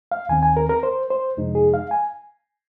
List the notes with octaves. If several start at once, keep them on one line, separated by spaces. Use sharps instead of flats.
F5
D#2 D#3 C4 G#5
G#5
A#4
A#4
C5
C5
F2 C3 F3 G#3 D#4
G#4
F5
G#5